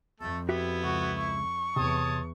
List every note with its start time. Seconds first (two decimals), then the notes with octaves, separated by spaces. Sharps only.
0.20 F2 A3 A4
0.49 B3 E4 F#4 G4 E5
0.84 C#2 F#4
1.18 C#6
1.76 E2 C3 E3 C#5 A5 D#6